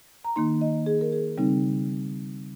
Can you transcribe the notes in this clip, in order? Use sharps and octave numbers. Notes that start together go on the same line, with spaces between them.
A#5
D#3 A#3 D#4 C6
D#5
G#4
A#4
G#4
C#3 G3 C4 D#4